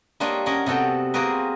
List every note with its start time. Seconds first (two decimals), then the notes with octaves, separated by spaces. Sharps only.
0.20 G3 A#3 D4 F4 C#5 D#5
0.46 C#4 A#4 D#5 F#5 G#5 B5
0.66 C3 B3 F#4 A4 G5
1.14 A#3 C4 F#4 G#4 A#4 B4